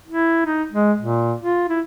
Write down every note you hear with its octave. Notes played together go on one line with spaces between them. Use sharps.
E4
D#4
G#3
A#2
F4
E4